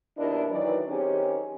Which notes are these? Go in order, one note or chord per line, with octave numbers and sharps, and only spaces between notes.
D#2 B2 D4 E4 A#4 D#5
D#3 E3 F#3 F#4 B4 D5
D#3 C4 C#4 G4 G#4